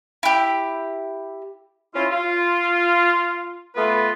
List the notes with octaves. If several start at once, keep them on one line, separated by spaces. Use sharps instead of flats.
E4 G4
C#4 E4 F4
F4
A3 B3 F4 B4